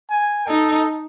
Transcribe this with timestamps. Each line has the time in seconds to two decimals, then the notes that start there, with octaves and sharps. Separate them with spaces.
0.10 G#5
0.48 D#4 A4